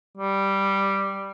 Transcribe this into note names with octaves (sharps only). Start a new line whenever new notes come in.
G3